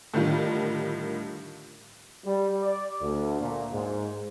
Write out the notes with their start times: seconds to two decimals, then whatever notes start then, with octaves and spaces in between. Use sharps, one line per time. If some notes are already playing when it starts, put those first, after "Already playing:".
0.14 A2 D3 D#3 G3 F4
2.25 G3
2.63 D5
3.02 D2
3.41 A#2
3.73 G#2